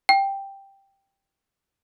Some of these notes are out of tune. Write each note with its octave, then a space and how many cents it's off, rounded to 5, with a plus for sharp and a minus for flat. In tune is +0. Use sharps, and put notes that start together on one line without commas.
G5 +5